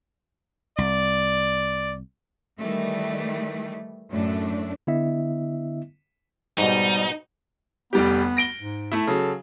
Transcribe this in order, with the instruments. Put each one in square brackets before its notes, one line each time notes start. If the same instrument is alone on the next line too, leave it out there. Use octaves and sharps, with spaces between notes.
[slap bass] C2 [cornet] D5
[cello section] D#3 E3 G3 A3
F#2 A2 A3 D4
[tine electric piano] D3 B3 E4 D#5 E5
[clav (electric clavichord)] G#2 B2 [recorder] G3 [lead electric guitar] D#4
[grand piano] F1 G3 G4 [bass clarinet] B3
[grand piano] A#6 D7 G7
[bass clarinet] G#2
[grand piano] A3 E4
[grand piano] C#3 F#3 [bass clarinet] A4